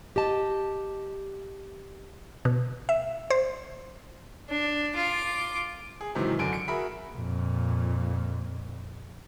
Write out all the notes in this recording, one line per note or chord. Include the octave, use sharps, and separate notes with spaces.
G4 D#5 A5
B2
E5
C5
D4
F4 D6
G#4
G#2 C3 D#3 E3 F#3
F#2 D3 D7
C#7 D7
F#4 G#4 A#4 E5 B5
F2 A#2